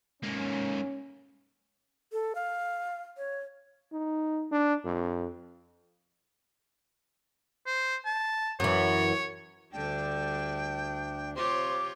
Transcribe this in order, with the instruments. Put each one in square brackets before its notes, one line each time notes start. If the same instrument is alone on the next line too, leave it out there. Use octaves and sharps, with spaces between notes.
[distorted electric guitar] G#2 A#3 [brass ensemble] C#4
[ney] A4
F5
C#5
[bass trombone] D#4
D4
F2
[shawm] C5
A5
[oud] F#2 E3 [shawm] C#5
[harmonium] D2 D4 [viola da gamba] D3 G3 [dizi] G5
[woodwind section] C3 F3 D6 [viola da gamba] F4 G4 C#5 [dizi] C6